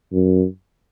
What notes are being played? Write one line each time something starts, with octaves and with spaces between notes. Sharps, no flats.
F#2